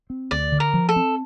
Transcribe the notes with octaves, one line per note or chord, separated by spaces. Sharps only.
C4
D2 D5
D3
A#4
F3
A4
C4